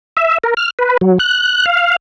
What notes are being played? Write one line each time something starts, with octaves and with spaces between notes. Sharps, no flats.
E5
A#4
F6
B4
F#3
F#6
F5